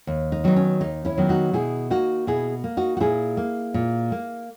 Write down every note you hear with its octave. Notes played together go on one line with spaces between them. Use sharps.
D#2
D#4
D#3 F#3 B3 D#4
C#4
D#2 D#4
C#4 E4
D#3 F#3 B3
D#4 F#4
B2 E4 G#4
A#3 D#4 F#4
B2 E4 G#4
A#3
D#4 F#4
F#4
A#2 E4 G#4
A#3
A#2
A#3